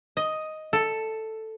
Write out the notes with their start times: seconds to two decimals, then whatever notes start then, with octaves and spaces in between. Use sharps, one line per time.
0.17 D#5
0.73 A4